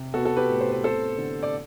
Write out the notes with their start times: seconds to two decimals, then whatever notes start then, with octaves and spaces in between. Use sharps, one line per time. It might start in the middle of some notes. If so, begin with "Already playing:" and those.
Already playing: C3
0.14 B3 F#4 A4
0.25 A4
0.36 G4 B4
0.49 A2
0.61 C5
0.72 B4
0.83 C4 A4 C5
1.18 D3
1.43 D5